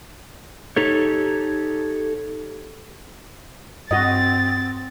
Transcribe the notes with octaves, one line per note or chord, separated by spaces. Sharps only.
D#4 G4 A4 C#5
G2 C4 F#4 D#5 A6